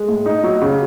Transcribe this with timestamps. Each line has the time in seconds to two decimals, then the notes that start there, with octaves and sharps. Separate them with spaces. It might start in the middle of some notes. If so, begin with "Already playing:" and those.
Already playing: G#3
0.08 A2
0.26 D#4
0.44 F#3
0.62 C#3